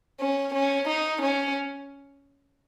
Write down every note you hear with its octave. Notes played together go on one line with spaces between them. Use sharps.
C#4
C#4
D#4
C#4